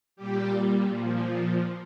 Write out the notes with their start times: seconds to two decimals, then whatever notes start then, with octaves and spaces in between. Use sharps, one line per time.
0.16 A#2 G3 G4
0.87 A#2 F3